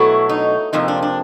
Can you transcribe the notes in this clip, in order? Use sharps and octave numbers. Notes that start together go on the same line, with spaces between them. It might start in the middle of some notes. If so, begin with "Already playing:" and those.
Already playing: B2 F#3 A3 E4
D#4
F2 C3 F3 A#3 D#4
D4
D4